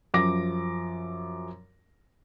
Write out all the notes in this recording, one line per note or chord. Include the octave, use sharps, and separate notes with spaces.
F#2 F3 D6 A#6